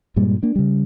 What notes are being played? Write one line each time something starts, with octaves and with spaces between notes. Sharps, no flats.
G2 A#2 G3 G#3
A#3 D4
C#3 G3